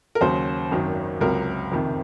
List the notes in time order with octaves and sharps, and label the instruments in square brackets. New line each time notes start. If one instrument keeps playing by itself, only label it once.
[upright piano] A#4
D#2 C#3 F#3 C5
G#1 F#2 D#3 F#3
C#2 C3 F#3 A#4
F#1 F2 C3 D#3